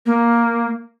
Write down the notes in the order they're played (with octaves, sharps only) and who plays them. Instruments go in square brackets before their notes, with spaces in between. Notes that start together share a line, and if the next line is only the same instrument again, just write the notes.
[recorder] A#3